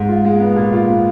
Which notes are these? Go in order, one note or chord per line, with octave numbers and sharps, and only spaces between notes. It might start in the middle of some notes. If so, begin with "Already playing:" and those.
Already playing: G#2
F4
G#3
B3
A#2
F4
B3